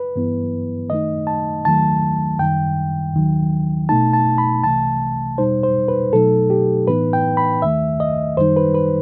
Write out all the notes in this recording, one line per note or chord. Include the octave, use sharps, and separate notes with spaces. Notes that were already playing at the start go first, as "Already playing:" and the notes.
Already playing: B4
G2 E3 B3 E4
F#2 D#3 A3 D#4 D#5
A5
D#2 D#3 F#3 A3 A5
F#2 D#3 G3 G5
D#2 D#3 F#3
B2 A3 D#4 A5
A5
B5
C2 C3 E3 A3 A5
E2 B2 G3 D#4 C5
C5
B4
B2 F#3 A3 D#4 A4
G4
A2 E3 B3 D#4 B4
G5
B5
D#2 D#3 A3 E5
D#5
F#2 D#3 G3 D#4 C5
B4
B4